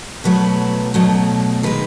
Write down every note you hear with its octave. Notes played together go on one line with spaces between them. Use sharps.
B2 F#3 A3 B4
B2 F#3 A3
D#3 G#3 B4